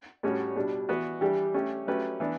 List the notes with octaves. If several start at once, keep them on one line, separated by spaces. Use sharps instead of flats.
A2 G3 C#4 F#4
B2 G3 D4
E3 B3 F#4 B4
E3 G3 D4 G4
A3 C#4 G4
F#3 A3 C#4 G4 B4
E3 B3 D4